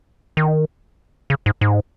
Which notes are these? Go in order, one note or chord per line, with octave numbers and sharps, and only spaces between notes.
D#3
C#3
G#2
G#2